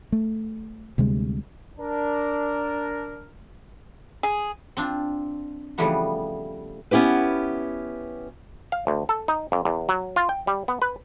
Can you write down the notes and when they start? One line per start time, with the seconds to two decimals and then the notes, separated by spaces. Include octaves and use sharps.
0.12 A3
0.98 D2 C3 G3 G#3
1.79 D4 A#4
4.23 G#4
4.77 C4 D4 F4
5.78 C#3 E3 F3 G3 A3 B3
6.91 B3 C#4 E4 G4 B4
8.72 F5
8.87 D2
9.09 A4
9.28 D#4
9.52 F2
9.65 E2
9.89 F#3
10.16 F4
10.29 G5
10.47 G3
10.68 B3
10.82 B4